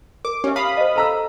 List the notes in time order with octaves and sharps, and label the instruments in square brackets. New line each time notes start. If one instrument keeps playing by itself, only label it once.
[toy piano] A#4 [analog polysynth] D6
[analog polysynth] C#4 [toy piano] G4 C#5 E5
[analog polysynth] F5 B5 D#6 [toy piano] A5
[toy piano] C5 D#5
[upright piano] A4 A#5 E6